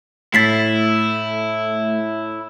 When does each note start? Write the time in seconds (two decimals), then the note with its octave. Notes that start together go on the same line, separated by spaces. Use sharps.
0.34 A2 A3 E4 A6 B6 C7